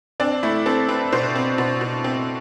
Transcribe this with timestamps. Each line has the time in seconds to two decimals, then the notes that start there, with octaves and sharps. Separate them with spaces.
0.20 C4 D4
0.43 A3 E4
0.66 C4 A4
0.89 C4 B4
1.13 B2 C5
1.36 C4
1.58 B2
1.81 B2
2.04 C4